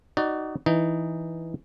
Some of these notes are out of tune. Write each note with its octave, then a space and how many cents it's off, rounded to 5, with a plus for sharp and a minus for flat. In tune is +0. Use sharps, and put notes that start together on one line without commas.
D#4 +0 F#4 +25 D5 +10
E3 +0 D#4 +0